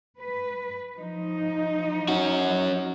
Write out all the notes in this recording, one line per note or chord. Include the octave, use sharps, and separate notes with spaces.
B4
F3 D#4
C#4 F#4